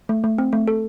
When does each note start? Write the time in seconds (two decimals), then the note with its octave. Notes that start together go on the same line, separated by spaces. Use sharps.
0.09 A3
0.24 A3
0.38 C4
0.53 A3
0.68 A4